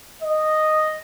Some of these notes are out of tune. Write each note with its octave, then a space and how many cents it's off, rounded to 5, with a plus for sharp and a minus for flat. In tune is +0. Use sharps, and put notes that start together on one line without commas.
D#5 -5